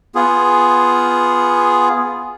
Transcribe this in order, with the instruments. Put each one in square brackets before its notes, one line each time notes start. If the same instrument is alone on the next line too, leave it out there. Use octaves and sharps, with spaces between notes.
[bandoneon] B3 F4 G#4